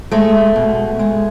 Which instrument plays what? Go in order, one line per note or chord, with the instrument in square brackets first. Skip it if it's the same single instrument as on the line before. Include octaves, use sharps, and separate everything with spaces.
[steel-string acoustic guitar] G#3 A3
B2
G#3